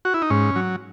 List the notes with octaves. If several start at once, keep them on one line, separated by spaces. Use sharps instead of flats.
F#4
E4
D#4
G#2 C#4
F#3